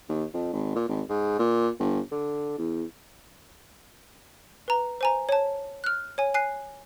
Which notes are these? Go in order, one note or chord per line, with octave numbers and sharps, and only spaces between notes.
D#2
F2
G#1
A#2
G#1
G#2
A#2
G1
D3
E2
B4 A#5
C5 G#5 A#5
C#5 A5
F6 F#6
C#5 G#5
G#5 F#6 C7